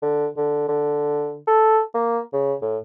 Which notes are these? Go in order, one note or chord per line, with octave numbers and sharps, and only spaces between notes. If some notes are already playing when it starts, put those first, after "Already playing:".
D3
D3
D3
A4
A#3
C#3
A2